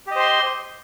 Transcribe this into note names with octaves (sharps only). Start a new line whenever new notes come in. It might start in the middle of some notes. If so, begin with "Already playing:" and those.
G4 C5 D#5 C6